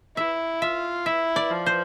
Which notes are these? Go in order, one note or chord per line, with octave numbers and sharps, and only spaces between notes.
E4 E5
F4 E5
E4 E5
D5
F3
C5